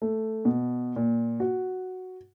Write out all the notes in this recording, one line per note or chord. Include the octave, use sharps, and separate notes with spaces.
A3
B2
A#2
F#4